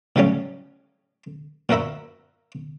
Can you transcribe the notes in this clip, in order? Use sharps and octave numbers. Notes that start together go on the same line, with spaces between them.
A2 C#3 F#3 G3 C#4
A#2 F#4 A#4 E5 B5